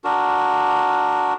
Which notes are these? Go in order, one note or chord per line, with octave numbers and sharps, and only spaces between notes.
D4 F#4 A#4